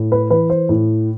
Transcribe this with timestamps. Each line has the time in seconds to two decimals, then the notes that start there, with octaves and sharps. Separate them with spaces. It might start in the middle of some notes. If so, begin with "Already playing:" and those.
Already playing: A2
0.12 B4
0.30 E3 B4
0.50 C5
0.69 A2